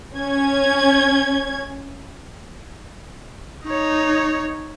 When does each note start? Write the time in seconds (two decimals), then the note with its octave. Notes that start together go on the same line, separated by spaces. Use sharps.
0.15 C#4 G#6
3.64 D#4 C#5